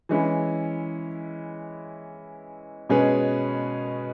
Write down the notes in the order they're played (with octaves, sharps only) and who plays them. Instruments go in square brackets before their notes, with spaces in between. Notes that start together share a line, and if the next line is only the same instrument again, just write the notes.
[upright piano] E3 G#3 C#4 E4
B2 G#3 C#4 G#4 B4